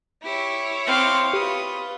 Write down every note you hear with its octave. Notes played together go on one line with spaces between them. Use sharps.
E4 G4 C#5
C4 F5 C6 D6
F4 G4 B4 D#6